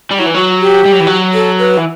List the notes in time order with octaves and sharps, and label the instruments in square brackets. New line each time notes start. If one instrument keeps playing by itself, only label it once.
[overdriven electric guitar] G3
[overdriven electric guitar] F#3 [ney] E4
[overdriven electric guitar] E3
[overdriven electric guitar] F#3 [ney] F#4
[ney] G4
[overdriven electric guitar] G3
F#3
E3
F#3
[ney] A4
B4
[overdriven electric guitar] E3